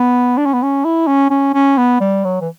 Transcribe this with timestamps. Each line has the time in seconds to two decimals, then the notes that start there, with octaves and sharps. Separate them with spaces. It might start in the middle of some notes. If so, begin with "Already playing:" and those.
Already playing: B3
0.38 D4
0.46 C#4
0.53 B3
0.63 C#4
0.85 E4
1.07 C#4
1.30 C#4
1.54 C#4
1.77 B3
2.01 G3
2.24 F#3
2.41 E3